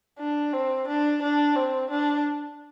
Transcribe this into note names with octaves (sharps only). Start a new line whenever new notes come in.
D4
C4
D4
D4
C4
D4